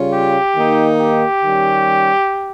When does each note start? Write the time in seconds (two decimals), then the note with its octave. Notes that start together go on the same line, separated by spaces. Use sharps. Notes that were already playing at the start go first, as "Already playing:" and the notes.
Already playing: C#3 G3 C#4 F4
0.12 G4
0.55 D#3 A#3 D#4
0.99 G4
1.43 D#3 G3 C#4